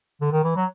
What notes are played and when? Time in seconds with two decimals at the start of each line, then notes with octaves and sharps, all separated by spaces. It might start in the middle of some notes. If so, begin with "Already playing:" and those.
0.21 D3
0.32 D#3
0.44 E3
0.57 F#3